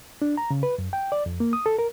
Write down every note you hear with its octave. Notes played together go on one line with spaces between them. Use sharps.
D4
A#5
C#3
B4
F#2
G5
D5
F2
A#3
D#6
A4
A#4